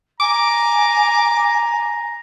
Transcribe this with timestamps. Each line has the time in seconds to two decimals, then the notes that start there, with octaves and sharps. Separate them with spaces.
0.20 G#5 A#5 D6